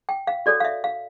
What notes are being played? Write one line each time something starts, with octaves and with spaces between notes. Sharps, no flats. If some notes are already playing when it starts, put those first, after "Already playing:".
G5
F5
F#4 A4 C#5 D5
F5
E5
F5